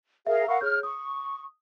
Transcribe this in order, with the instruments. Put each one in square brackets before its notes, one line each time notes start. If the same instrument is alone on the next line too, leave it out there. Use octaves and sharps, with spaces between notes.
[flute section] G#4 A#4 F5 [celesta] E5
[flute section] A#4 F5 F#5 [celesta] B5 C#6 E6
[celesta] G#4 C#5 G6 [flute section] F6
[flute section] C#6 [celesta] D#6